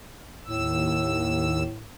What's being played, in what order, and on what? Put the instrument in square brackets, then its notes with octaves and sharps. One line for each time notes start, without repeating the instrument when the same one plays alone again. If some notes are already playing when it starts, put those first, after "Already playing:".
[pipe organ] D#2 E6 [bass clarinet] A2